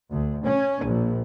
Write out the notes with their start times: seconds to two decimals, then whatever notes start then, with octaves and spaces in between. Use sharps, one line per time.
0.11 D2
0.45 C#4
0.85 A#1